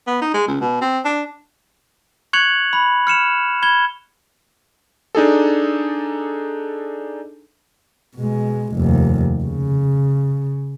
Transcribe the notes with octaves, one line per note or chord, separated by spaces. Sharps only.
B3
D#4
G#3
C#2
B2
C4
D4
C#6 F#6 G#6 C#7 F7 F#7
B5
F6 C#7 E7 F7
B5 G#6 G7
D4 D#4 G#4 A4
B2 G#3
F1 D#2
C#3